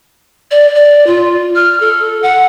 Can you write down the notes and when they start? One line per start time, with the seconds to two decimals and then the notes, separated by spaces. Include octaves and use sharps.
0.51 D5
0.75 D5
1.07 F4
1.55 F6
1.80 A4
2.22 F#5